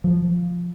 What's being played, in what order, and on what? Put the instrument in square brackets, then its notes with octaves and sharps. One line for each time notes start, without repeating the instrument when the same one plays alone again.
[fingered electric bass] F3